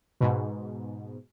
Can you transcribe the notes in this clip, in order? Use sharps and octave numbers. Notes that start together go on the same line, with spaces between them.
G#2 B2